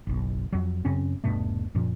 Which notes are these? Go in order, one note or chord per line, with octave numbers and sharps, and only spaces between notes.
F#1 B1
F2 F#3
F#2 C#3 C4 C#4
D#1 G2 B2 A3
F#2 A#2 F3